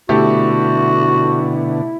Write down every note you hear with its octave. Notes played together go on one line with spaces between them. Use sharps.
B2 D3 A3 E4 F#4 G4